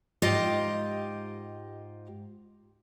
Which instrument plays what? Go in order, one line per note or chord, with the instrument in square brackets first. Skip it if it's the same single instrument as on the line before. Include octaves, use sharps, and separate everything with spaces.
[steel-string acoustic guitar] G#2 F4 G4 D#5 G5